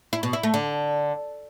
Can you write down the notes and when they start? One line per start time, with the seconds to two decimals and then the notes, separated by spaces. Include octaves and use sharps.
0.13 E4
0.23 B2
0.33 E4
0.43 A3
0.54 D3